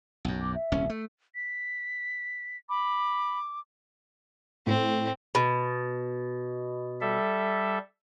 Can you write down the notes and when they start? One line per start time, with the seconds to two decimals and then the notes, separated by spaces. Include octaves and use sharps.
0.25 B1 F#2
0.41 D6
0.54 E5
0.72 D#1 C2 C#4
0.90 A3
1.35 B6
2.69 B5 D6
4.67 A2 C4
5.35 B2
7.01 G3 A4 E5